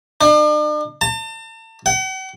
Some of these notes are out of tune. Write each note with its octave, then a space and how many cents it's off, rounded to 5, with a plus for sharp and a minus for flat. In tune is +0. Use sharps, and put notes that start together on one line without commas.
D4 +45
A5 +40
F#5 +45